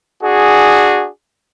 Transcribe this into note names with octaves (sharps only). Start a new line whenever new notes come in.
D4 F#4 G#4